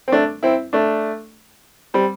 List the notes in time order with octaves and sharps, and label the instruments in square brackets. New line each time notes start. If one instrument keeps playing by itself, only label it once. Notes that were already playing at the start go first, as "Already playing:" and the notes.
[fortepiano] C4
A3 D4
C4 E4
A3 D4
G3 C4